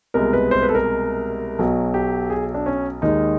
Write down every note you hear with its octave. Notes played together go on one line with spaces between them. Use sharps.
C2 B2 G#3 A#4
B4
C5
B4
A4
A#4
B1 B2 F#3
G4
G#4
D4
C#4
D#2 D#3 G#3 D#4